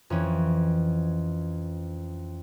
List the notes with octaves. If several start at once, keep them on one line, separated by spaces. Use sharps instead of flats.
F2 E3 C#4